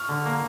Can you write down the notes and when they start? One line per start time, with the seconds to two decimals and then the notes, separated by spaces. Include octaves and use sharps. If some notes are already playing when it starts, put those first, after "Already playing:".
Already playing: C#6 F6
0.09 D3
0.26 A#3